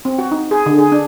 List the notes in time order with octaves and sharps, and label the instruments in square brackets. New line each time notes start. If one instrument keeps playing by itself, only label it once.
[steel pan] C4
F#4
D#4
G#4
D3
G#4
D4